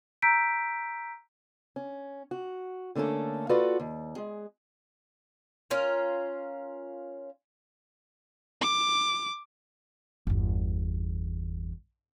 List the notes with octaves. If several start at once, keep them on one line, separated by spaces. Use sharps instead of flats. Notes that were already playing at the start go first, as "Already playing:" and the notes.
A#5 E6 G6 B6 D7
C#4
F#4
D3 A3 A#3 C#4 A4
F4 F#4 A4 B4 D5 F#5
D#2
G#3 G#4
C#4 F4 A#4
D6
G1 E2